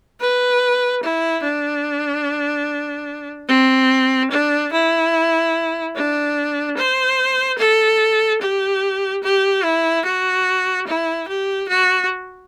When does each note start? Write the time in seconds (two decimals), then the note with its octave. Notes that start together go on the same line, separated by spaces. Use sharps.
0.21 B4
1.03 E4
1.44 D4
3.49 C4
4.31 D4
4.73 E4
5.95 D4
6.78 C5
7.59 A4
8.41 G4
9.23 G4
9.64 E4
10.06 F#4
10.87 E4
11.28 G4
11.69 F#4